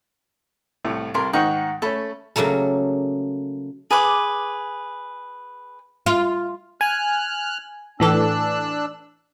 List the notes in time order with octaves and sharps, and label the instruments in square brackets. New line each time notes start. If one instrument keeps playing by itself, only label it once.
[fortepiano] C2 A2 A3
[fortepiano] C2 A#4 [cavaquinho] E4 A4 C6
[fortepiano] G#2 D#3 D#4 [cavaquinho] F#5 G5 C#6
[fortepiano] A3 C#4 [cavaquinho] A4 B5
[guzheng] C#3 F#3 A3 A#3 A4
[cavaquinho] G#4 B4 D6
[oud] F4
[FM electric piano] G#5 [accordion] F6 F#6
[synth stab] A2 E3 A4 [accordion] D4 E6 F#6